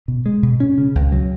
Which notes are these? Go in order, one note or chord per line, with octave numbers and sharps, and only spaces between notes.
B2
G#3
B2
C#4
C#3
C#2
F#3